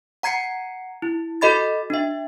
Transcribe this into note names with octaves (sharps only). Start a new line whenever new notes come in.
F#5 A#5 G#6 C7 C#7
E4
F#4 A4 D#5 B5 A6
D4 E5